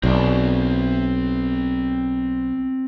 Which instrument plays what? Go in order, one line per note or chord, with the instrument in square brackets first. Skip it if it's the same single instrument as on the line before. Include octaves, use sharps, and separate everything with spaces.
[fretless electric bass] B1 [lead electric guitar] C4 D5